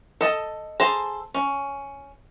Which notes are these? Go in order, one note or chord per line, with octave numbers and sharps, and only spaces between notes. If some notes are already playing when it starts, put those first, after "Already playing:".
A4 D#5 A5
G#4 A4 C5 A5 A#5
C#4